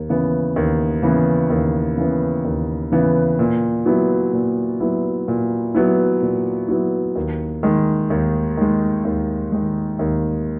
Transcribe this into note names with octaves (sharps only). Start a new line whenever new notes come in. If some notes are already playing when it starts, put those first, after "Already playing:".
Already playing: D#2
C#3 E3 B3
D#2
C#3 E3 B3
D#2
C#3 E3 B3
D#2
C#3 E3 B3
A#2
F#3 B3 E4
A#2
F#3 B3 E4
A#2
F#3 B3 E4
A#2
F#3 B3 E4
D#2
D#3 G#3
D#2
D#3 G#3
D#2
D#3 G#3
D#2